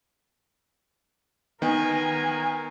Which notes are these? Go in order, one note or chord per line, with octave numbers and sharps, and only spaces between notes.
D#3 B3 A#4 G#5